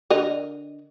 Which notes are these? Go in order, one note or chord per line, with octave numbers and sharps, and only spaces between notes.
D3 A#4 D#5